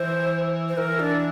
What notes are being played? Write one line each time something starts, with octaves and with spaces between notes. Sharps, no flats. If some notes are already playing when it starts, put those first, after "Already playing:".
Already playing: E3 C5
C5
E3 A#4
D4